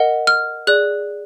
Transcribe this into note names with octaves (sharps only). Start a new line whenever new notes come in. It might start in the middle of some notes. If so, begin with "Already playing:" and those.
Already playing: A#4 D#5 F#5
F6
G#4 D5 F#6